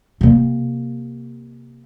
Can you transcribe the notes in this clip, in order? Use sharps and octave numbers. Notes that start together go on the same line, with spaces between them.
C3 A#3